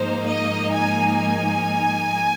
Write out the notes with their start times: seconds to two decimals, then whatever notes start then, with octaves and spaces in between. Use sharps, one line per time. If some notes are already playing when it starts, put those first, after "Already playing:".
Already playing: G#2 F3 A#3 D#4 C5
0.27 D#5
0.72 G#5
1.16 G#5